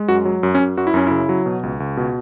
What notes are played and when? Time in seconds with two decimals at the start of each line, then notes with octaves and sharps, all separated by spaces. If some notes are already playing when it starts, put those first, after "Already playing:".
Already playing: G#3
0.08 F#2 F#4
0.25 F#3
0.43 F#2
0.55 C#4
0.60 F#2
0.77 F#2 F#4
0.87 E4
0.94 F#2 C#4
1.07 C#3 E4
1.29 F#3
1.46 B2
1.63 C#2
1.80 C#2
1.97 B2